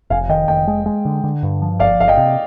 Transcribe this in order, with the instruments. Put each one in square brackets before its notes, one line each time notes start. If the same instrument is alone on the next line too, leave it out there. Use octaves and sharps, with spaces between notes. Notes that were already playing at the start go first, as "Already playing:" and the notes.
[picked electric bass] F1 [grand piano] F5 G#5
[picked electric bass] D#3 [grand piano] D#5 G5
[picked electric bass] F1 [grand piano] D#5 G5
[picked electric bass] G#3
G#3
D3
D3
G2
F3
[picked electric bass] G1 [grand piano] D5 F5
[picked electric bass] G1 [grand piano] F5
[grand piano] D#5 G5
[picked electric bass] C3